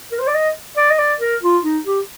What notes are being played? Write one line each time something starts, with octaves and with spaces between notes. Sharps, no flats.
A#4
C5
D5
D#5
D5
D#5
D5
A#4
F4
D#4
G4